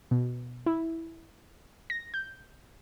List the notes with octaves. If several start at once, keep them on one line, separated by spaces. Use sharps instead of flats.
B2
E4
A#6
G6